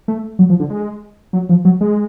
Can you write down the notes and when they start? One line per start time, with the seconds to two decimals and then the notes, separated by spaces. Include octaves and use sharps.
0.08 A3
0.39 F#3
0.50 F3
0.60 D3
0.70 G#3
1.33 F#3
1.49 F3
1.65 F#3
1.81 G#3